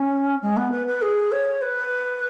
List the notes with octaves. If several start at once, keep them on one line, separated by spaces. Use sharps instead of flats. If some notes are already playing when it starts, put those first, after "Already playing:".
Already playing: C#4
G#3
B3
B4
B4
G#4
C#5
B4